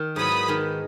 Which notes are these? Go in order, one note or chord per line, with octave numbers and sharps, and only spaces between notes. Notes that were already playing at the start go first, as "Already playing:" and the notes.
Already playing: D#3
G#2 F#3 B3 E4 B5 D#6
D#3 G#3 D#4